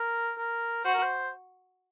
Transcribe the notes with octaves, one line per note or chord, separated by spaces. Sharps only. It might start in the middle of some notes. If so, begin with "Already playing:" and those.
Already playing: A#4
A#4
F#4 C5
A#4
C5